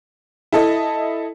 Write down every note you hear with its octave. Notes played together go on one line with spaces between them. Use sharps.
E4 A4 D#5